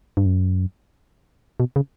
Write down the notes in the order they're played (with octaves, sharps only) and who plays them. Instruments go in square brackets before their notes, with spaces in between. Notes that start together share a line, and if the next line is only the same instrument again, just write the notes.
[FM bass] G2
F#2
B2
C#3